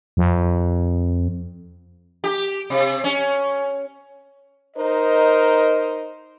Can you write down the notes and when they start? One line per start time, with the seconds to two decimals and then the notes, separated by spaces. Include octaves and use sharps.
0.17 F2
2.24 G4
2.70 C3
3.04 C#4
4.77 D#4 A#4 C5 D#5